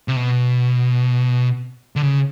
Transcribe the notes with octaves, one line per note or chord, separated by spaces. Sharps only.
C3
B2
D3
C#3